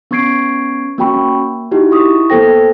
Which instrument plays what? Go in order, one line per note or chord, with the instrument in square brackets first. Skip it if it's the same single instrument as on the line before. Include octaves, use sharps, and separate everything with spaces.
[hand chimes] B3 C#4 C#6 G#6 C7 D7
A#3 C#4 F#4 G5 B5 C#6
A#3
D#4 E4 F#4 G4
E4 C#6 D#6
A#3 B3 A4 C5 G5 A#6